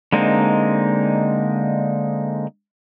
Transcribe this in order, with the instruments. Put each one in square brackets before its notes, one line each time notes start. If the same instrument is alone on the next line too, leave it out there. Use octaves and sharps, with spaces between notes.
[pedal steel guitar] D3 G#3 A#3 C4 D#4